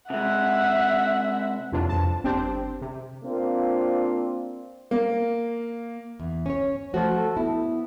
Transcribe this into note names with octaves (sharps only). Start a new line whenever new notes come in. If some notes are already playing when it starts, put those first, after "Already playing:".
C3 G#3 E5 F#5
F2 C3 E3 F#3 D4 F4
F2 A5
G1 C4 D4 G4 C5
C3
A#3 C4 D4 F4
A#3
E2
C#4 C#5
F3 A3 F#4
A4
B3 E4